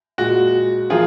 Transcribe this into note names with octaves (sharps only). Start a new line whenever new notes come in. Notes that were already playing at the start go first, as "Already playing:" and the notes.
A#2 G#3 F#4
F3 A#3 F4 G#4